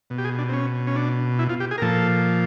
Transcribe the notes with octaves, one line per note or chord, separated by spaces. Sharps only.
B2
G4
G#4
D4
C4
C#4
C#4
D4
E4
F4
G4
G#4
A#4
A#2 F3 A4